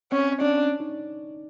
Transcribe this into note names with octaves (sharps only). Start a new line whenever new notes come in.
C4 C#4
C#4 D4
D#4